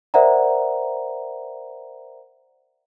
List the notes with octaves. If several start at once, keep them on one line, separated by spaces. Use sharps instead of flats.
A#4 C5 D5 E5 F#5 A#5